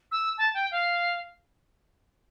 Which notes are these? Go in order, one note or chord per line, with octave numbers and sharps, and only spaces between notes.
E6
A5
G5
F5